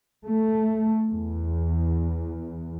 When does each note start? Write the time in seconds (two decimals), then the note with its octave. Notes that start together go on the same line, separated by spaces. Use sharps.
0.25 A3
1.10 E2